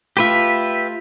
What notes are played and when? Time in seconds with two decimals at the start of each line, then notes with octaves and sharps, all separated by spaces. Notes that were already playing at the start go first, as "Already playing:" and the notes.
0.17 A3 F4 G4 B4 E5